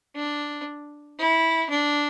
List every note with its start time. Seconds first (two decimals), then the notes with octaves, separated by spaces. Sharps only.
0.16 D4
1.19 E4
1.70 D4